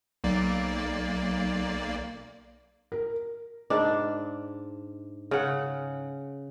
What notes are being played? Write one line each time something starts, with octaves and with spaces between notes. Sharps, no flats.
B1 A#3 D5
A#4
G#2 D4
C#3 F#5